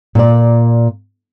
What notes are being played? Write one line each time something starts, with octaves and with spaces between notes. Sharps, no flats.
A#2 D5